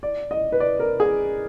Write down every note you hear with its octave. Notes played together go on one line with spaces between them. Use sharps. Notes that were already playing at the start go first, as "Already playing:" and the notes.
D5
D#5
B4
D5
A#4
G#4